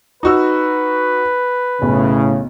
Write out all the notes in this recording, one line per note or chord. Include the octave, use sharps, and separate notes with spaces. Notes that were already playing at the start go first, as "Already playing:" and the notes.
D#4 F#4 B4 E6
B1 A2 C#3